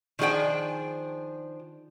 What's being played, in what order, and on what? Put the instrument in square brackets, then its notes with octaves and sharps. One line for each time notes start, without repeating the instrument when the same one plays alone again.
[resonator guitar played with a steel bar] D#3 F3 D4 G#4 C5 G5